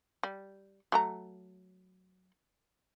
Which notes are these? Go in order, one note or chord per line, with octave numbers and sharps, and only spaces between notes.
G3
F#3 A3 A#5